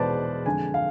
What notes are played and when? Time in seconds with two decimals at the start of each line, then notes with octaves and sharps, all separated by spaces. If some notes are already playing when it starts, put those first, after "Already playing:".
Already playing: E2 B2 G#3 B4 C5 D5 A5
0.46 F2 D3 G#3 G#5
0.74 F5